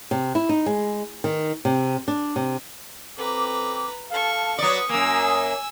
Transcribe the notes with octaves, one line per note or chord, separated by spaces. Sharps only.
C3
E4
D#4
G#3
D#3
C3
D4
C3
F2 C4 B4 A#5 D6
A4 F5 A5 C#6
F#3 B4 D5 C#6 D#6
F#2 A#3 G#5 E6